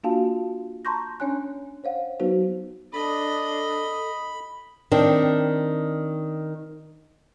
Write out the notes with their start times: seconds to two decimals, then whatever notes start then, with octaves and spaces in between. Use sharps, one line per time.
0.03 A#3 D4 F4 F#4 F5 A5
0.85 A5 A#5 C6 C#6 G6 A#6
1.20 C#4 D4 C#5 G#5 F#6
1.84 C5 C#5 F5 F#5
2.20 F#3 B3 D#4 F#4 B4 C5
2.93 D4 A4 D#5 B5
4.91 D#3 C4 D4